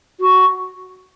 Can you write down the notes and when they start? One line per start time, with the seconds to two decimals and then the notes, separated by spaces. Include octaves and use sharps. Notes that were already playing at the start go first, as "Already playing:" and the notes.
0.20 F#4